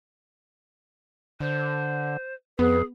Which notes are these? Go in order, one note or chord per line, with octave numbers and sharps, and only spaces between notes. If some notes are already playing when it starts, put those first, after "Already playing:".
D3 C5
F2 B3 G#4 B4